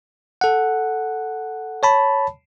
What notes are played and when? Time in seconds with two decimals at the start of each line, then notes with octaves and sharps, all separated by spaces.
0.41 A4 F#5
1.83 C#5 A5 B5